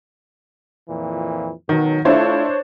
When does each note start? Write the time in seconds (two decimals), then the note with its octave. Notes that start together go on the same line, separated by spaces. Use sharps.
0.89 F2 A#2 E3
1.69 B2 D#3 F#3
2.05 A3 D4 E4 F4 C5 C#5